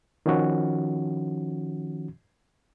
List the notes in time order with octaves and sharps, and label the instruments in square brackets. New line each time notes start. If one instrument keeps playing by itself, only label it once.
[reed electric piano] D#3 F3 C#4 F#4